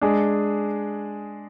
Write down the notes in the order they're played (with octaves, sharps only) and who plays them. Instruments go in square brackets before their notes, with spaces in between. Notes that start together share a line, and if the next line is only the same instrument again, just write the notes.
[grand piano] G#3 D4 G#4